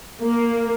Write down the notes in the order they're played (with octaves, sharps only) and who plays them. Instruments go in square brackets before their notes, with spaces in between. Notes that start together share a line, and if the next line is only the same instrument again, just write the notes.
[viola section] A#3